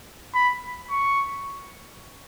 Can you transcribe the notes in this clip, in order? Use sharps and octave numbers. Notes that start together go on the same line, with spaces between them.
B5
C#6